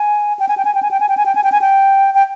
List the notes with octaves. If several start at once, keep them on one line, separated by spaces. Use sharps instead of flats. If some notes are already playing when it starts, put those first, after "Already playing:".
Already playing: G#5
G5
G#5
G5
G#5
G5
G#5
G5
G#5
G5
G#5
G5
G#5
G5
G#5
G5
G5